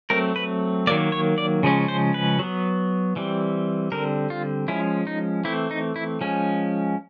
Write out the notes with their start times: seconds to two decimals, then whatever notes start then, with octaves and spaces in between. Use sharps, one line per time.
0.10 F#3 A3 C4 A#4
0.36 B4
0.87 D#3 F#3 A#3 D5
1.12 C#5
1.38 D5
1.63 C#3 F3 G#3 C#4
1.88 C5
2.14 B4
2.39 F#3 B3
3.16 E3 G3 C4
3.92 D3 G3 C4 A#4
4.30 F4
4.68 F3 G#3 C#4 E4
5.07 D#4
5.44 E3 A3 C4 E4
5.71 D#4
5.96 E4
6.21 F3 G#3 C#4